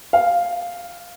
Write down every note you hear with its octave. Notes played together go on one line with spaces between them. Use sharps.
F5